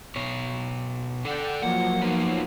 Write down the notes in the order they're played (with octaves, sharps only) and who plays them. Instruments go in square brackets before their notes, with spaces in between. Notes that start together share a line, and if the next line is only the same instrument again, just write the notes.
[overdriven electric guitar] B2 C#5
[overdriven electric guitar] D3 A4 [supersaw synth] D5 F#5 G5
[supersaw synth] F3 F#3 A#3 [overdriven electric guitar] F#5
[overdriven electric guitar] B3 D#4